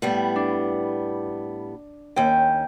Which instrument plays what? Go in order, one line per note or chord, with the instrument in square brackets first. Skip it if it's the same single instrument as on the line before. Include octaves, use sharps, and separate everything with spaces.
[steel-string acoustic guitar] A2 G3 B3
[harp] D4
[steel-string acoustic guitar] D#2 C#4 [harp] G5